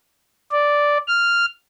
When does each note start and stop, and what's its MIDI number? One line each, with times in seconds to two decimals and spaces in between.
0.52 0.98 74
1.08 1.46 89